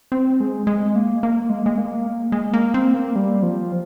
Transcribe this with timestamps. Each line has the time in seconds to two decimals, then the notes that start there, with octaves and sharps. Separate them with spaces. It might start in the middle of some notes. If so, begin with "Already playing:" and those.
0.12 C4
0.40 G#3
0.67 G#3
0.95 A#3
1.23 A#3
1.50 G#3
1.66 G#3
1.78 A#3
2.32 G#3
2.53 A#3
2.74 C4
2.94 A#3
3.16 G3
3.43 F3